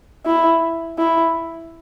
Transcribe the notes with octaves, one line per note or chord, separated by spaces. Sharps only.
E4
E4